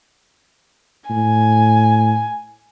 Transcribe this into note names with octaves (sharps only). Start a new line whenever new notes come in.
A2 G#5